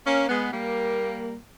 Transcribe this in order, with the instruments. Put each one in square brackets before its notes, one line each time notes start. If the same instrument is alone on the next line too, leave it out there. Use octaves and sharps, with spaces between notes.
[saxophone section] A#3 C#4
G#3 B3
G3 A#3